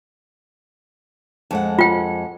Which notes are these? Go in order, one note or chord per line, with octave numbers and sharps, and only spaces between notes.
F2 G#3 F#5
F4 G5